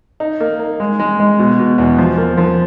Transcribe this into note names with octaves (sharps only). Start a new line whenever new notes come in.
D#4
A#3
D#4
G#3
G#3
G#3
B2
B2
E2
F3
A#3
F3